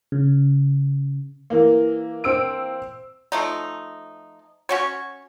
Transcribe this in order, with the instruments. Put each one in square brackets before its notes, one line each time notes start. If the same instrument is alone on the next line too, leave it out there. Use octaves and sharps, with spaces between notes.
[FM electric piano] C#3
[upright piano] E3 A#3
[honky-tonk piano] C4 E6 D7
[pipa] F3 A3 D#4
C#4 F#4 C#5